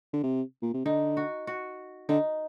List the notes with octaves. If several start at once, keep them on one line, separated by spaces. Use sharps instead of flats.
D3
C3
A#2
C3
D3 D#4
F#4
F#4
D3 D#4